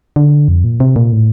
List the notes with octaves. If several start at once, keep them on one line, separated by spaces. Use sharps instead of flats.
D3
F2
A#2
C3
A#2
A2